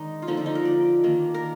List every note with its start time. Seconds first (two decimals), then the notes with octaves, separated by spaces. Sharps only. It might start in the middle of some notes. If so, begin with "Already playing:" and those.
Already playing: D#3 G#3 D4 D#4
0.22 F4
0.28 D3 F3 A#3 D#4
0.37 D4
0.46 D#4
0.55 A#4
0.65 D5
1.04 D#3 A#3 D4
1.34 A#4